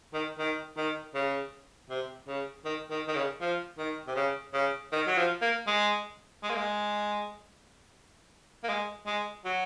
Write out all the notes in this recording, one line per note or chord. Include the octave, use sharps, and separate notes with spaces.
D#3
D#3
D#3
C#3
C3
C#3
D#3
D#3
D#3
C#3
F3
D#3
C3
C#3
C#3
D#3
F#3
F3
A#3
G#3
G#3
A#3
G#3
A#3
G#3
G#3
F#3